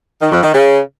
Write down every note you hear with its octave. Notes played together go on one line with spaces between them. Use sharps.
D#3
F2
D#3
C#3